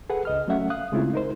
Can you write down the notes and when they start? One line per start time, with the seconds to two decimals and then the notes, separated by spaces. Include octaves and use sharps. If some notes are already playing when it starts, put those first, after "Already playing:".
0.10 G#4 A4 B4 F#5
0.25 C#2 D#5 F6
0.48 F#3 A3 C#4 A4 E5 F#5
0.70 F5 D#6 F#6
0.92 C#3 G#3 A3 C4 E4 F4
1.14 D#4 A#4 C5